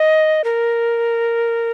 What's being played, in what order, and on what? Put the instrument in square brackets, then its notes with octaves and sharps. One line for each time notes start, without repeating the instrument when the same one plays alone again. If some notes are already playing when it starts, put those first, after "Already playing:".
Already playing: [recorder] D#5
A#4